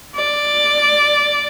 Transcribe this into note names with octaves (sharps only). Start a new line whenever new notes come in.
D5